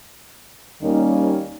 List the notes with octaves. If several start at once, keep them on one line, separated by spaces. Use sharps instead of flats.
D#2 D#3 G3 A#3 C#4 D#4